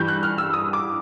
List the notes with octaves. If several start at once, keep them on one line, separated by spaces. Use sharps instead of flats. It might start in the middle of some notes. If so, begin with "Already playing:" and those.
Already playing: G2 E3 G3 G6
F#6
F6
E6
D#6
D6